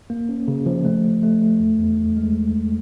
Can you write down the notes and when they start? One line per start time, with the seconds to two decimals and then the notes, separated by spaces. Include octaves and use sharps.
0.10 A#3
0.29 C#4
0.48 C#3
0.66 F3
0.85 A3
1.04 F3
1.23 A3
1.42 A3
1.60 E2
1.79 E2
1.97 E2
2.17 G#3